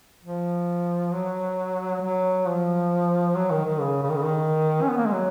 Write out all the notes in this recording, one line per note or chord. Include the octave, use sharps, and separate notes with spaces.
F3
F#3
F#3
F3
F#3
D#3
D#3
C#3
C#3
D#3
C#3
D#3
C#4
B3
A#3
G#3
F#3